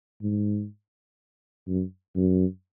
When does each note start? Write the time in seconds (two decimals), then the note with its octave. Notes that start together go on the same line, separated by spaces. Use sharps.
0.22 G#2
1.68 F#2
2.16 F#2